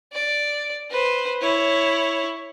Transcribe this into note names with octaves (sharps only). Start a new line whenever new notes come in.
D5
B4 C5
E4 C#5